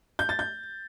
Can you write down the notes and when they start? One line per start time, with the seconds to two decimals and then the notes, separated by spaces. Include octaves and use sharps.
0.19 G6
0.29 A6
0.39 G6